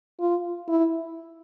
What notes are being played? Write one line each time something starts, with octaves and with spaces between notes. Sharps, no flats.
F4
E4